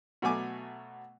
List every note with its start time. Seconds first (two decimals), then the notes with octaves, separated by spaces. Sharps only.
0.22 B2 F#3 A3 G#5 D6